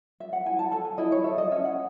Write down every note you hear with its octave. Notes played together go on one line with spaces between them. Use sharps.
E5
F#5
E4 G#5
A5
A4 A5
G#5
E4 D#5
C#5
A4 E5
D#5
C#4 E5
F#5